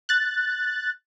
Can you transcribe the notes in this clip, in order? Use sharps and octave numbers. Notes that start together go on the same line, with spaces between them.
F#6 A6